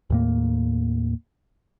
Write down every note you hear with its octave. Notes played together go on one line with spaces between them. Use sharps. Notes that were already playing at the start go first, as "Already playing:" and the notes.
D#2 A2 A#3